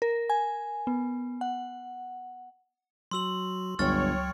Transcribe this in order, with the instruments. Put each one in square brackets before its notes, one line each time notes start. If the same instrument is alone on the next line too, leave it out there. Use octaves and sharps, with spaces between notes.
[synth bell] A#4
G#5
B3
F#5
[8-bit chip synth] F#3 F#4 [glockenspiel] C6 E6 F#7
[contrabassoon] G1 [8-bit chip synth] C#2 F#3 G5 [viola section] C#5 [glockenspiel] C#6 F6 A6